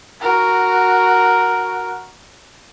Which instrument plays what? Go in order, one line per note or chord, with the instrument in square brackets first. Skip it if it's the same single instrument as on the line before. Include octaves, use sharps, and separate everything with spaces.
[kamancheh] F#4 A#4